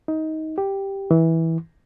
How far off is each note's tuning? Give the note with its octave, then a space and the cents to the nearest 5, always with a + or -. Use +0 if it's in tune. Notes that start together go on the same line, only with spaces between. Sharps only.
D#4 +20
G4 +0
E3 -15